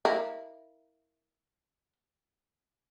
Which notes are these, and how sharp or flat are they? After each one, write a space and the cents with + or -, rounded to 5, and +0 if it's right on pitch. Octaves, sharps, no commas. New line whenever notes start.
E4 -25 A#4 +0 F5 -15